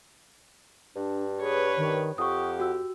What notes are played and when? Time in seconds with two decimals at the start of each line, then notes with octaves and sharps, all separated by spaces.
0.96 G2 D4
1.41 G#4 B4 C#5
1.77 D#3
2.18 F2 G4 F#5 C#6 D#6
2.60 F#4 E6